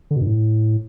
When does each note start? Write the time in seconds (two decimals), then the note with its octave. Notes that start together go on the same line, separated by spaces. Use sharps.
0.11 D3
0.16 B2
0.21 G2
0.27 A2